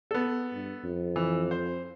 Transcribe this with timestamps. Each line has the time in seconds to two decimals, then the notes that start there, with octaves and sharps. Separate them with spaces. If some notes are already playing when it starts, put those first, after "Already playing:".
0.11 B3 A4
0.54 G2
0.84 F2
1.16 E3
1.51 C5